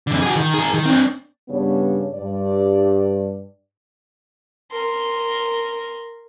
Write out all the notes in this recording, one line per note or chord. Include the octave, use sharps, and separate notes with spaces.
F2 D3
F#4 G#4
D#3
G#4 A#4
D#3
C4 D4
G2 C#3 G3 B3 D4 C#5
G2 D5
A#4 C6